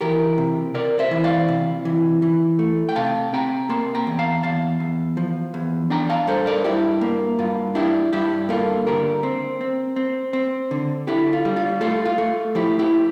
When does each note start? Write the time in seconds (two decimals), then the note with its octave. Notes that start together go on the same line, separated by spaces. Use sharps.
0.01 E3 G4 A#4
0.38 C3
0.74 C3 A#4 D5
0.99 C5 E5
1.11 E3
1.24 D5 F5
1.48 C3
1.85 E3
2.22 E3
2.59 A3
2.89 G5
2.96 C3 F5 A5
3.33 C3 G5 A#5
3.69 A#3 A5 C6
3.95 G5 A#5
4.07 E2
4.19 F5 A5
4.43 E2 F5 A5
4.80 E2
5.17 F3
5.54 E2
5.90 D4 G5 A#5
6.10 F5 A5
6.27 G2 A4 C5
6.46 A#4 D5
6.64 G2 E4 G4
7.01 A#3
7.39 G2 F4
7.75 D4 E4 G4
8.13 G2 E4 G4
8.49 A#3 F4 A4
8.87 D3 G4 A#4
9.23 C4
9.61 C4
9.96 C4
10.33 C4
10.71 D3
11.07 D3 E4 G4
11.33 F4
11.45 G3
11.56 F4
11.81 A3 F4 A4
12.05 F4
12.18 A3
12.55 F3 E4 G4
12.79 E4 G4